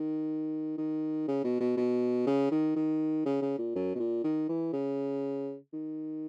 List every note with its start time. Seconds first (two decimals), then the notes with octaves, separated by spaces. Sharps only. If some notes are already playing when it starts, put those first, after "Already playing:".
Already playing: D#3
0.78 D#3
1.28 C#3
1.45 B2
1.61 B2
1.77 B2
2.27 C#3
2.51 D#3
2.76 D#3
3.26 C#3
3.42 C#3
3.58 A#2
3.75 F#2
3.95 B2
3.99 A#2
4.24 D#3
4.49 E3
4.73 C#3
5.73 D#3